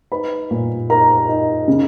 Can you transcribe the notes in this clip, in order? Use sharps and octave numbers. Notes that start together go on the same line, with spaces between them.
D#4 B4 B5
A#2
D#4 A#4 A#5
D#4
C#3